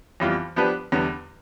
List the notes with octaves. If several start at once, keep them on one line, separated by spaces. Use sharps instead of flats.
F2 E3 G3 B3 F4
F3 B3 D4 G4 B4
E2 D3 G3 B3